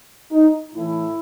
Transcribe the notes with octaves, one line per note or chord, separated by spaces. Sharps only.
D#4
A2 E3 E4